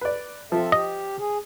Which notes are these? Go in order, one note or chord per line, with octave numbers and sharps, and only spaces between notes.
B4 D5
F3 C4 A4 E5
G4 D#5
G#4